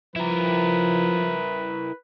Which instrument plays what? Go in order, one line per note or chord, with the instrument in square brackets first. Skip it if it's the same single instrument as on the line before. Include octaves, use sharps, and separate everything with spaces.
[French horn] F3 [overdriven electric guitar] E4 A#4 [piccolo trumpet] B4